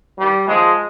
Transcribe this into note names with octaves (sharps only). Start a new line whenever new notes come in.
G2 D#3 G3
D#2 D#3 F3 G#3